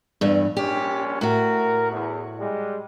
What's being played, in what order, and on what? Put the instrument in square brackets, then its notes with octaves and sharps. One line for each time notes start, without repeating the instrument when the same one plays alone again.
[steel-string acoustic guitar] E2 G2
[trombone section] A#1 G3 C#4 [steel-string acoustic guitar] G4
[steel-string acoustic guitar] A2 F#4 [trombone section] A#4
[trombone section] E2
G3 G#3